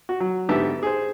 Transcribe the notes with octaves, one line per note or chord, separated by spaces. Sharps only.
F#4
F#3
G#2 D3 B3 G4 E5 A5
G#4 C5